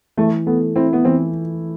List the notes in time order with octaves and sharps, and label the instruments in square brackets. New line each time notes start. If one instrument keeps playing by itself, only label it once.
[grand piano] E3 [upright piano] A3
[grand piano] A3 [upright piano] B3
[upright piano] C4 [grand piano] E4
[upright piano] B3
[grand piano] E3 [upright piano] C4